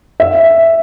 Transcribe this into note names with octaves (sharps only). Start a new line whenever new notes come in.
E5